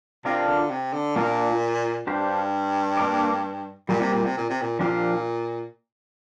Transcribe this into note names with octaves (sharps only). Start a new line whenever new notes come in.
C3 D4 F4 A#4 D5 F5
D3
C3
D3
A#2 A#3 D4 F4 A#4
G2 D4 G4 C5 F5
A#3 D4 A#4 D5
A#2 G3 A#3 G4
C3
A#2
C3
A#2
C3
A#2
A#2 F3 D4 G4 A#4 F5